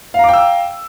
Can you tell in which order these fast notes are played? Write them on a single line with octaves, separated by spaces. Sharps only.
F5 A#5 D6 G5 E6